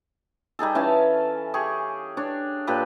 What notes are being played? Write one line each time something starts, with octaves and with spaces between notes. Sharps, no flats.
G3 D#4 G#4 A4
E3 C#4 F5 A5
G4 G#4 C#6
D4 C#5
A#2 G4 A4 B4